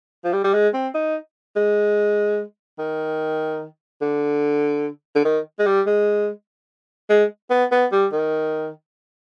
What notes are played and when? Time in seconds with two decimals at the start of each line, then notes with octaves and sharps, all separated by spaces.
0.24 F3
0.33 G3
0.44 G3
0.54 G#3
0.74 C4
0.94 D#4
1.56 G#3
2.79 D#3
4.02 D3
5.15 D3
5.25 D#3
5.59 G#3
5.66 G3
5.86 G#3
7.10 G#3
7.50 B3
7.72 B3
7.92 G3
8.12 D#3